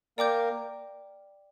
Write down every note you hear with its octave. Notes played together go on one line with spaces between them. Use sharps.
A#3 A#4 D5 G5 D6 G6